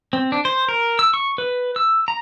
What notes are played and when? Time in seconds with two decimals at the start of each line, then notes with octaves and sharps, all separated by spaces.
0.13 C4
0.32 D4
0.45 C5
0.69 A#4
0.99 E6
1.14 C#6
1.38 B4
1.76 E6
2.08 A#5